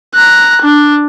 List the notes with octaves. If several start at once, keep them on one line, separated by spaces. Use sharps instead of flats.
A#5 F#6
D4